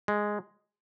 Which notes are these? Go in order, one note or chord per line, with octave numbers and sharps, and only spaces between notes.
G#3